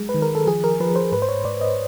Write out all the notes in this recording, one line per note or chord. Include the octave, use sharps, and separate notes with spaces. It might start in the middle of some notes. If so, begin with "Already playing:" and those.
Already playing: F#3 G#3 G#4
B4
D#3
A#4
A4
F3 G#4
A#4
F3 B4
C5
G#2 B4
C5
C#5
G#2 D5
D#5